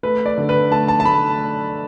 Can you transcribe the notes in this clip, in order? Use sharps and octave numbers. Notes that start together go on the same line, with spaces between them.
A3 B4
D5
D3
B4
A3 A5
A5
A5
A3 B5